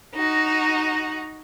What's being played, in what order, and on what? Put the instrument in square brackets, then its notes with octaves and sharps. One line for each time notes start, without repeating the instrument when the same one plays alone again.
[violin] D#4 F#4